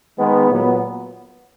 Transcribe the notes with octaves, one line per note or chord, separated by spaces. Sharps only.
D#3 G#3 B3
A#2 F#3 B3